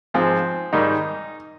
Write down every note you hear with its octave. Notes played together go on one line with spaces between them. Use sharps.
G#2 F3 G#3 C4
G#2 D#3 G3 D#4